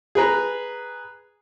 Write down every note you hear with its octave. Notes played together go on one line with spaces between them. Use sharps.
G#4 B4 A#5